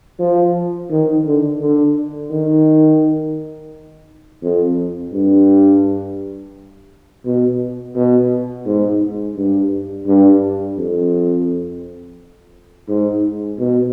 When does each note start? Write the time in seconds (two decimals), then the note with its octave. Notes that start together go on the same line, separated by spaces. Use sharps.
0.19 F3
0.90 D#3
1.26 D3
1.61 D3
2.31 D#3
4.42 F2
5.13 G2
7.25 B2
7.95 B2
8.65 G#2
9.36 G2
10.06 G2
10.78 F2
12.88 G#2
13.58 B2